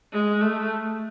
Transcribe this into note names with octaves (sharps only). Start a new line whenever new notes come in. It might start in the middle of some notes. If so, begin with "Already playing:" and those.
G#3
A3